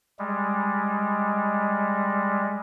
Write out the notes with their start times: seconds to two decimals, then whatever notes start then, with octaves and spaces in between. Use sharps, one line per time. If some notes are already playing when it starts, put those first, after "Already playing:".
0.19 G3 G#3